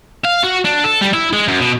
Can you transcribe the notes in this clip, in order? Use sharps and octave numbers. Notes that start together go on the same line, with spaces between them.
F5
F#4
D4
A4
G3
E4
G#3
F#2
B2